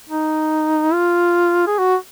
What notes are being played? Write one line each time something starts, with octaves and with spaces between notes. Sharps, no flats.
D#4
F4
G#4
F#4